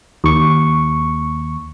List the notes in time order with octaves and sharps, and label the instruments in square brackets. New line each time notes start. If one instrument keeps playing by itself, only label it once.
[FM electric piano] D#2 C#6